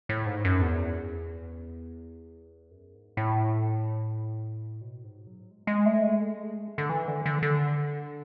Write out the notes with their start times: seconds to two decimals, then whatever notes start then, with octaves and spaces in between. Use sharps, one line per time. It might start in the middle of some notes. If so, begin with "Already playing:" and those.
0.09 A2
0.26 G#2
0.45 F#2
0.62 E2
2.71 F#2
2.95 G#2
3.17 A2
4.81 B2
5.04 G#2
5.27 F#3
5.51 G#3
5.67 G#3
5.86 A3
6.03 G#3
6.21 A3
6.43 G#3
6.78 D3
6.89 E3
7.08 D3
7.26 D3
7.43 D3